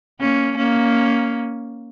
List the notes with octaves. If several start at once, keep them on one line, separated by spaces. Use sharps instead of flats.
A#3 C#4
A#3 C#4